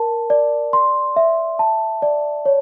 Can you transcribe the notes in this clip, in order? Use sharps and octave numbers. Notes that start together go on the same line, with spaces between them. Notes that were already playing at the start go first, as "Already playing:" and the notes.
Already playing: A#4 A5
D5
C6
E5
A5
D5
C#5